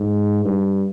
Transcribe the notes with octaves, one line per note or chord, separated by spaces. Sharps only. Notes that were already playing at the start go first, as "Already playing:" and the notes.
Already playing: G#2
G2